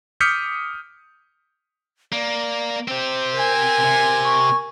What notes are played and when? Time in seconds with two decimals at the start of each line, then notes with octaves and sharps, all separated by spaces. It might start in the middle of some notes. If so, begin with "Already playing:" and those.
0.20 D6 D#6 F6 G6 B6 C#7
2.13 A#3 D5
2.88 C4 G4 C5
3.35 A#4 G#5
3.84 C3 C6
4.24 C#6